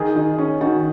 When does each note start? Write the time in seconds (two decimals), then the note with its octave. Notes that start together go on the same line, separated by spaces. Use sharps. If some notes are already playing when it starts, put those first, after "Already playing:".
Already playing: D#3 G#4
0.16 D#3
0.38 C#4
0.61 D#3 F#4